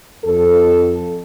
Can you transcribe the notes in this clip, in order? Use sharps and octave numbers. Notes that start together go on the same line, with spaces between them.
F2 A4